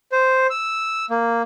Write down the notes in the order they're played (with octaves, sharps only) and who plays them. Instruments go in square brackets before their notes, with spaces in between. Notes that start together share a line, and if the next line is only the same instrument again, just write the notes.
[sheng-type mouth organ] C5
E6
A#3